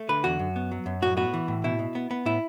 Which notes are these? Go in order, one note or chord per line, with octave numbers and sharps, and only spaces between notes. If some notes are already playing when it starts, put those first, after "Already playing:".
Already playing: A3
D3 B4
E2 F#4
F#2
B3
F#3
F#2
A2 F#4
B3 F#4
E3
A2
B2 E4
B2
B3
B3
A2 E4